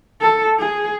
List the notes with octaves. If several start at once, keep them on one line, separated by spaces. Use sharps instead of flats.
A4
G#4